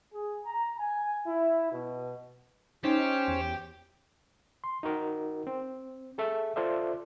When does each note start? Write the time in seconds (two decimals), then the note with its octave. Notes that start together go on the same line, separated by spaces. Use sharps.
0.13 G#4
0.45 A#5
0.78 G#5
1.26 E4
1.71 B2
2.84 C#4 D#4 G4 C5 C#5
3.28 E2
4.64 C6
4.83 D#4 F#4 A#4
5.47 C4
6.18 G#4 A4 E5
6.56 F4 A4 C5 D5 E5